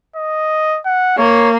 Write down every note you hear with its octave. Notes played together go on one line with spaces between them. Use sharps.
D#5
F#5
A#3 C#5